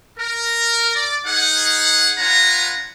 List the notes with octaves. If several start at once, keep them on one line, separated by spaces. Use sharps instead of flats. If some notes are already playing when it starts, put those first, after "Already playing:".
A#4
D5
D#4 G#4 F#5
D4 F4 B4 F#5 G#5 A#5